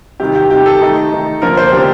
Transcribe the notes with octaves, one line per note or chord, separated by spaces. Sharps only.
C3 D#3 G3 G4
G4
C3 D#3 G3 G4
A4
D#3 A3 D#4
D#3 A3 D#4
D3 F3 A#3 D4 A#4
C5
D3 F3 A#3 D4 G4